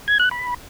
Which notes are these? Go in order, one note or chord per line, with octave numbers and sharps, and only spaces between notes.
G#6
F#6
B5